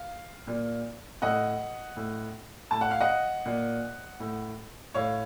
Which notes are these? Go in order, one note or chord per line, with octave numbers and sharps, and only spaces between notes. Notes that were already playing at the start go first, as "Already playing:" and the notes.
Already playing: F5
A#2
A2 D#5 F#5
A2
A2 A5
F#5
F5
D#5 F#5
A#2
A2
A2 C#5 F5